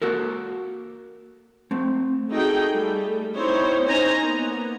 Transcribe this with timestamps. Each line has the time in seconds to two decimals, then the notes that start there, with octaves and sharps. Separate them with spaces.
0.02 A#3 F#4 A4 A#4
1.71 A3 C4
2.32 A3 D#4 F#4 G#4 A4 G5
2.73 G3 A3
3.36 C4 D#4 E4 C5 C#5
3.86 C4 C#4 D#4 C5 G#5 A#5
4.22 A#3 B3